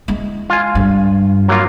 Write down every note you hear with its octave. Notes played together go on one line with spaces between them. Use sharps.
G#3 E4
F4 G#5
G2
F#3 A#3 F4